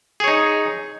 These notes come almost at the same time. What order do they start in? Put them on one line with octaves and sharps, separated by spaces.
G#4 C#5 D#4